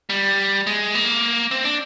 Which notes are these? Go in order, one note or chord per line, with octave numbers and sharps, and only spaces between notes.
G3
G#3
A#3
C4
D4